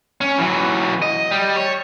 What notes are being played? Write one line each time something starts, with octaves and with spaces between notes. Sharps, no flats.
C#4
E3 F#3
D#5
G3
C#5